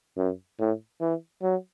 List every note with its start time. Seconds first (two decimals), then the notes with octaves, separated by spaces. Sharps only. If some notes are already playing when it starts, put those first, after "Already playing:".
0.17 F#2
0.59 A2
1.01 E3
1.42 F#3